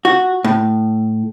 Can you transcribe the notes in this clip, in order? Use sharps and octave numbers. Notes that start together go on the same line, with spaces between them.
F#4
A2